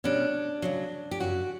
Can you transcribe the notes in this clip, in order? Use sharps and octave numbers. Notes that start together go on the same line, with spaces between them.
B2 G3 C#4 D4
D2 C#3 F#3
G4
F#2 C#3 F#3 F#4